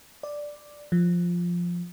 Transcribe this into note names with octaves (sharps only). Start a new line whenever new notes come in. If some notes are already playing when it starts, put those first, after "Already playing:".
D5
F3